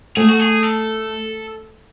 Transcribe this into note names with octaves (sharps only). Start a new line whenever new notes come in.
A3 G#4
F#4
G#4
A4